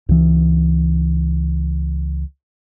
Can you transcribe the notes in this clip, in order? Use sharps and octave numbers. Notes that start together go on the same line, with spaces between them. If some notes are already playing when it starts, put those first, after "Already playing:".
C#2 E3